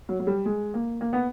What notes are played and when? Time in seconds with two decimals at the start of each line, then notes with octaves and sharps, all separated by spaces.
0.09 F#3
0.20 F#3
0.27 G3
0.45 G#3
0.74 A#3
1.01 A#3
1.13 B3